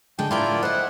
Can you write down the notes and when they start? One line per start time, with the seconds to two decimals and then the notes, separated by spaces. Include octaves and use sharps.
0.19 D3 G#3 G5
0.31 A2 E4 F4 A#4 D5 G5
0.63 C5 D#5 F#5